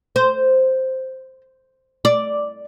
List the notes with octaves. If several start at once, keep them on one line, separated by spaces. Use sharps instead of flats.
C5
D5